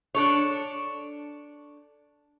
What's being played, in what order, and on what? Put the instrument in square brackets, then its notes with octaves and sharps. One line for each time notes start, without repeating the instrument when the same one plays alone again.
[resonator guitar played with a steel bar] D4 A4 C#5